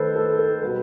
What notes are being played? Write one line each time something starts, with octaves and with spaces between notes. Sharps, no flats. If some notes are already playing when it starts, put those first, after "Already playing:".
Already playing: D#3 A3 A4 B4 C5
A4
A4
B2 G3 B4